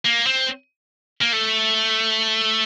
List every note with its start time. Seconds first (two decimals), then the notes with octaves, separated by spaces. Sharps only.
0.05 A#3
0.27 C4
1.22 A#3
1.33 A3